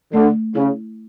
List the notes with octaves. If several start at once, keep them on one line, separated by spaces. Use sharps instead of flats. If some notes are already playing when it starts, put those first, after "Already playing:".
D3 A3
C#3 E4